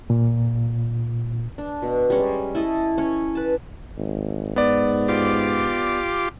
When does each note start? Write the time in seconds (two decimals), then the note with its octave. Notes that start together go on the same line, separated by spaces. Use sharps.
0.10 A#2
1.58 D4
1.82 B2
2.10 G3 G#3 C#4 C#5
2.55 E4 A4 D#5
2.98 C#4 C#5
3.35 B4 A5
3.98 G#1
4.56 G#2 B3 D5
5.08 F4 G4 D6